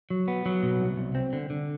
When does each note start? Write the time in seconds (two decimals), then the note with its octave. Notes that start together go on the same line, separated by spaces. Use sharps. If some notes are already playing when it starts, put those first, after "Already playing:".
0.10 F#3
0.28 B3
0.46 F#3
0.63 B2
0.80 C2
0.97 C2
1.15 C4
1.33 D3
1.50 D3